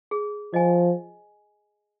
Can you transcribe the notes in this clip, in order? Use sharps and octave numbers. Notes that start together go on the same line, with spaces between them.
G#4
F3 D#5 G#5